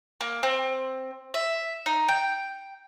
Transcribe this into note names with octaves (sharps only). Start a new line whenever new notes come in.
A#3
C4
E5
D#4
G5